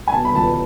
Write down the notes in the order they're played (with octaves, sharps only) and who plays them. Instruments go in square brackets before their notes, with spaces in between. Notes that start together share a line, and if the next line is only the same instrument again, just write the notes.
[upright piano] G#5
B2 A5
B5
C#2 A5